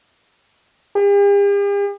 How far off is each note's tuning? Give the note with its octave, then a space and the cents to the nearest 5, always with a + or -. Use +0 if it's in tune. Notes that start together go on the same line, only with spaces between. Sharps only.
G4 +45